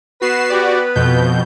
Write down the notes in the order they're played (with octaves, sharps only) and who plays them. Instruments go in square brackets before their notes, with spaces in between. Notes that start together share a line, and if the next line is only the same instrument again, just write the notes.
[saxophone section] B3 B4 [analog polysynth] F#4 C7 E7
[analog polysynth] F#4 G4 D5
F2 B2 G6